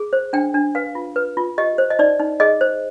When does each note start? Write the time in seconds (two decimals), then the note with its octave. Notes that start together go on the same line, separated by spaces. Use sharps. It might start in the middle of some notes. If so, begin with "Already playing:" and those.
Already playing: G#4
0.13 C5
0.33 D4 G5
0.54 D4
0.75 B4 F5
0.95 F4
1.16 B4
1.37 F4
1.58 G4 D#5
1.78 C5
1.90 D#5
1.99 D#4 D5
2.19 D#4
2.40 G#4 D#5
2.61 C5